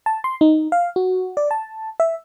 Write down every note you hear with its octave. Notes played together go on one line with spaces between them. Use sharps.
A5
C6
D#4
F5
F#4
D5
A5
E5